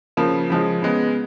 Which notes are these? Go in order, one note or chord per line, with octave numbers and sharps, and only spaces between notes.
C#3 F3 A#3
C#3 F3 G#3
C#3 G#3 B3